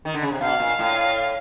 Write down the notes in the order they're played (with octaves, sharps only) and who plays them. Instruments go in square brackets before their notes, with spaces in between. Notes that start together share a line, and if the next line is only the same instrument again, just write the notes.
[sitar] D#3
D3
C#3
C3
[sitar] B2 [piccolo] F5
[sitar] A#2
A2